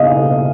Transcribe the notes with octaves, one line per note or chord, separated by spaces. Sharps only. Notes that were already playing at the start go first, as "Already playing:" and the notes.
Already playing: D#5 F5